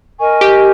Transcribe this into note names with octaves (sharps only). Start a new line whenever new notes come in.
A#4 D#5 G#5 C#6
G4